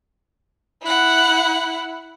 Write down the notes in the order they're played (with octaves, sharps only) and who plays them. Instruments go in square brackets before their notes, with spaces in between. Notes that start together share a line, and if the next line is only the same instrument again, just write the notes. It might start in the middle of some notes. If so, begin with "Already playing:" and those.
[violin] E4 F#5